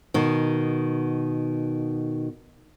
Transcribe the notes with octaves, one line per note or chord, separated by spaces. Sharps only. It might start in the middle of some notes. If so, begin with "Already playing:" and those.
B2 D#3